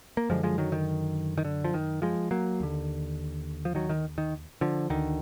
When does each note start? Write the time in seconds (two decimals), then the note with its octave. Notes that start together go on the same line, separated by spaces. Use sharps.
0.17 A#3
0.30 F#2 D3 F3 G#3
0.43 F3 G#3
0.58 D#3 F#3
0.72 D#3
1.38 D#3
1.45 D3
1.64 F3
1.74 D#3
2.02 F3 G#3
2.31 F#3 A#3
2.60 D#2 D3
3.65 F3
3.75 D#3 F#3
3.89 D#3
4.18 D#3
4.61 D3 F3
4.90 D2 D3 D#3